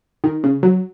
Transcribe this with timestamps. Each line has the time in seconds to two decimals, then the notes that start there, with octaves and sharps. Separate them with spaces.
0.24 D#3
0.44 C#3
0.63 F#3